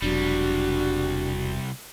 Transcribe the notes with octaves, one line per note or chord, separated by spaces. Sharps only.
E1 C2 F#3 G3 D4 F#4